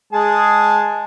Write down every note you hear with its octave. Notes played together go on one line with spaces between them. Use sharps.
G#3 G#4 A5